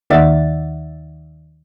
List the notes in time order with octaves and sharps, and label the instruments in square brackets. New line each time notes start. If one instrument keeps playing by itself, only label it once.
[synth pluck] D#2 D#3 D5 E5 F#5 A6